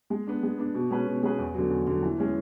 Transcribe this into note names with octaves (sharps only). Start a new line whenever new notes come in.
G#3
B3 D4
G#3
B3 D4
B2
G#3 C#4 G#4 B4
B2
G#3 C#4 G#4 B4
E2
D3 F#3
E2
D3 F#3
E3
G#3 C#4